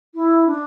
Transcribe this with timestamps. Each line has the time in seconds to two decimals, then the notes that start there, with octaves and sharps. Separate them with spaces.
0.15 E4
0.46 D4